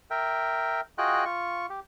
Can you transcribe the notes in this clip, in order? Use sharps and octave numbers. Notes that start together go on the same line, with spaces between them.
A#4 E5 G5
F4 F#4 G#4 D#5 G5 F#6
F4 C#6
G4